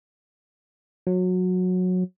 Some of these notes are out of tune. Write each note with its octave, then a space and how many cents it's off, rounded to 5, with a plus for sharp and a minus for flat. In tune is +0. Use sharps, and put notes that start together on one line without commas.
F#3 -20